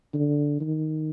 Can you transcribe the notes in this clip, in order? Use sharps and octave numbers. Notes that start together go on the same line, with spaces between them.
D3
D#3